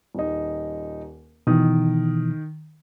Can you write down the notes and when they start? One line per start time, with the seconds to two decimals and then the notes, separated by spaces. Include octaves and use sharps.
0.15 D#1 D#4
1.47 B2 D#3 E3 D#6